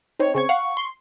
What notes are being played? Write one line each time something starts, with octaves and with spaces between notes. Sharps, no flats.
C4 D#4 C#5
C#3 C4 C#6 G#6
F5 F#5
C6